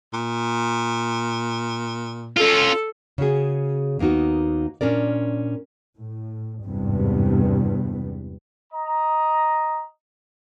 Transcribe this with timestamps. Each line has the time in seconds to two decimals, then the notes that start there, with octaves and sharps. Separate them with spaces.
0.13 A#2
2.37 C#4 F4 A4
3.18 C#3 C#4 F#4 G#4
3.99 D#2 A#3 B3 D#4 F#4
4.81 A#2 C#4 D4 A#4 D5
5.98 A2
6.65 G#1 E2 G2 C3 B3
8.73 D#5 A#5